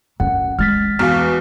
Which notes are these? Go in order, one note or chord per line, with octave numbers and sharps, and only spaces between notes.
F#2 F#5
G#3 F6 A6 B6
E2 B2 F5 F6